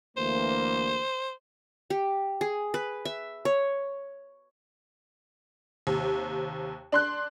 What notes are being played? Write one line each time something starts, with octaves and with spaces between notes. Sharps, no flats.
D2 E3 A#3 C5
G4
G#4
B4
E5
C#5
D#2 C3
D4 C6 F#6